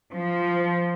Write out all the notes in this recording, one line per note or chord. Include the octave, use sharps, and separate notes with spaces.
F3